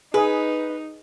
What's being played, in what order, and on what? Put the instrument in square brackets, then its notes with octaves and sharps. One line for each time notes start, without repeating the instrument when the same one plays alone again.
[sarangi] D#4 [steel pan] G#4 [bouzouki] B4